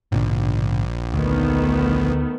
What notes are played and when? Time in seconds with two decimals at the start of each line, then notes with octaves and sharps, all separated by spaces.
0.12 A#1 G#2 B2 D3
1.13 D2 D#3 A3 B3